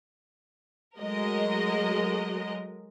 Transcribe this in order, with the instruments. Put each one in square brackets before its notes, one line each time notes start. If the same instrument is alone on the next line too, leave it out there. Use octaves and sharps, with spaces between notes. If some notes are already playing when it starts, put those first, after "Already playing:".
[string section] F#3 G#3 A3 F#4 A#4 D#5